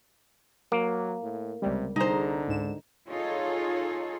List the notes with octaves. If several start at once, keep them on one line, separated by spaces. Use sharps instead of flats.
F#3 A#3
A2
C#2 C3 G3
C2 D3 D#4 G#4 C5 A#5
C#2 G#2 E7
D#4 F4 G#4 A4 C#5